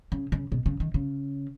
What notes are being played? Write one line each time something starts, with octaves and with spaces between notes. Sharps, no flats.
C#3
C#3
B2
C#3
D#3
C#3